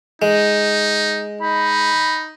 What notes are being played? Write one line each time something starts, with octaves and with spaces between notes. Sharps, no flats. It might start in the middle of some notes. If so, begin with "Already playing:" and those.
G#3 D#4
D#4 B5